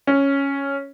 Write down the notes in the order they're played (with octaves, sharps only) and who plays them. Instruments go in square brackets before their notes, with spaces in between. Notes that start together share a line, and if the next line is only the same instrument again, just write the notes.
[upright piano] C#4